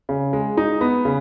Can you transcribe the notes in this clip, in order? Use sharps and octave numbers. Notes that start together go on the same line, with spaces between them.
C#3
G#3
D#4
B3
C#3